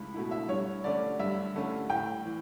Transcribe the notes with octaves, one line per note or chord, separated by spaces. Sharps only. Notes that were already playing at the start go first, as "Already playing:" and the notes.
Already playing: C#2 A3 E4 B5
B2 A3 E4
E5
G2 C#5
D3 A3 C#4 D5
G2 E5
D3 A3 C#4
A2 G5
E3